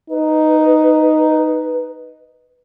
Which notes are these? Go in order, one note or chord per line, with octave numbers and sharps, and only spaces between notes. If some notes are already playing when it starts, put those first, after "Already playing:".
D#4 B4